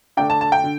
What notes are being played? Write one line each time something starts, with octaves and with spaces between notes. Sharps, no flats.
D3 A3 D4 G5
A5
A5
G5
D3